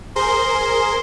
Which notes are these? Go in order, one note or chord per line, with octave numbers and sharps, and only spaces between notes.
G#4 A#4 C5 C6